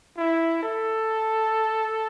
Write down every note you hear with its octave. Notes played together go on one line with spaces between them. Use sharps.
E4
A4